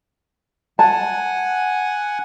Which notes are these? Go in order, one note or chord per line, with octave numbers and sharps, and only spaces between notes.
F#5 G#5 A5